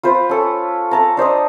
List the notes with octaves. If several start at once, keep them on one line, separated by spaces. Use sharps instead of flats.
F4 B4 C5
C#4 A4
A4 A5 A#5
D4 C5 D#5 D#6